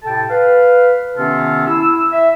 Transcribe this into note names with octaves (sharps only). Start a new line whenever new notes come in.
A2 C3 A4 G5 A5
B4 F5
C3 D#3 B3 C#4 F4 A4
E4 E6
E5